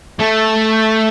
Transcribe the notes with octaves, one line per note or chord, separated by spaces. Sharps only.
A3